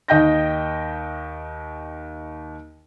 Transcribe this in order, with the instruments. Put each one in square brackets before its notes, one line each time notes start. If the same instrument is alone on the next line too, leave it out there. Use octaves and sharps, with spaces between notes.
[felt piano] D#2 D#5 G5 G6 A#6